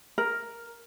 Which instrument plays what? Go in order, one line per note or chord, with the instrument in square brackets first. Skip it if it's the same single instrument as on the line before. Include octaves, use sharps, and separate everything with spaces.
[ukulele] A#4